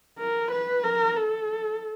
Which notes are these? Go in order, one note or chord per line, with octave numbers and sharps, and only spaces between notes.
A#4
B4
A#4
A4